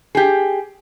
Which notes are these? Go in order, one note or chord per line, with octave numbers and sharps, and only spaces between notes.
G4 G#4